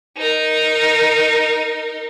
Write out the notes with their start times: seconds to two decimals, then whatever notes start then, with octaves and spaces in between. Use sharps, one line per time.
0.17 D#4 A#4